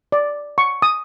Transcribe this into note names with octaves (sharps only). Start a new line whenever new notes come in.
D5
C#6
D#6